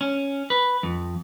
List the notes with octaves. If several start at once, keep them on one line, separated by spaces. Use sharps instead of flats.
C#4
B4
F2